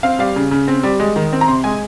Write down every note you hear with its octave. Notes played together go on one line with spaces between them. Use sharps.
C4 F5
G3 F5
C#3
C#3
C4
G3
G#3
D#3
C4
A#5
C3 C6
G#3 G#5